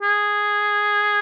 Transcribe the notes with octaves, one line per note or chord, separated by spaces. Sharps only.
G#4